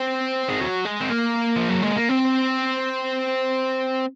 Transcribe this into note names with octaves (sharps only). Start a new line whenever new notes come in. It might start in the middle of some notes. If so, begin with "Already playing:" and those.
Already playing: C4
G#3
F#3
G#3
C4
A#3
F3
F#3
G#3
A#3
C4